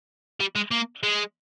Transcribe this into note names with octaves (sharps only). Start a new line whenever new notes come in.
G3
G#3
A#3
G#3